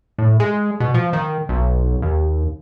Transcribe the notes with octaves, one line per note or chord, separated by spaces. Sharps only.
A2
G#3
B2
F3
D#3
B1
D#2